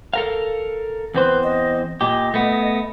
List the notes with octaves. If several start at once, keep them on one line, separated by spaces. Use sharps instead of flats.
A4 A#4 F5
E2 C4 B4 C5
D#5
A#2 G4 D#5
A3 B3